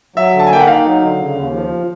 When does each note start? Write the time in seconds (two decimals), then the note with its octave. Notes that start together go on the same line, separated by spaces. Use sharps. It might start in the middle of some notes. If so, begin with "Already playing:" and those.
0.16 F#3 E5
0.33 D3
0.39 A5
0.47 G#5
0.50 A#3 G5
0.60 F#5
0.67 D#4 F5
0.85 F#3
1.02 D3
1.18 C#3
1.36 D#2
1.53 F3